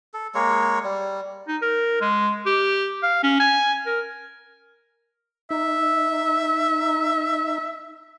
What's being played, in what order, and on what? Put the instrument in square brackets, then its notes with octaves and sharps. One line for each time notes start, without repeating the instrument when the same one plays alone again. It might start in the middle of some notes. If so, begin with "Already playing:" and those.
[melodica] A4
G#3 A#3 C#5
G3
[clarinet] D#4
A#4
G#3
G4
F5
C#4
G#5
A#4
[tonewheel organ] D#4 [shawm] E5